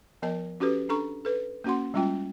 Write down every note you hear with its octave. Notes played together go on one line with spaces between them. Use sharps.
F3 B3 A#4 D#5 A5
C#4 F#4 G4 A4 B4
D4 A4 A#5 C#6
A4 B4
A#3 C#4 F#4 F#5 C6
G3 G#3 C#4 F4 G5